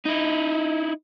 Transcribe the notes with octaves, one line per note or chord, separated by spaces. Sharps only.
D#4 E4